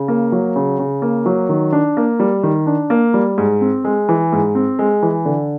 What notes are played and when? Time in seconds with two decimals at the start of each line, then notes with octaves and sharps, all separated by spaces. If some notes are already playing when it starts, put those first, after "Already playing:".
Already playing: C#3
0.08 A#3
0.32 F#3
0.56 C#3
0.79 C#3
1.02 A#3
1.26 F#3
1.49 D#3
1.73 D4
1.97 A#3
2.20 G3
2.43 D#3
2.67 D4
2.90 A#3
3.14 G3
3.38 G#2
3.61 C4
3.84 G#3
4.09 E3
4.32 G#2
4.55 C4
4.79 G#3
5.02 E3
5.25 D3